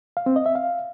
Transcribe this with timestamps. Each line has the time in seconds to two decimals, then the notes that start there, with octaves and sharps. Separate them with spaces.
0.17 F5
0.26 C4
0.36 D#5
0.46 E5
0.55 F5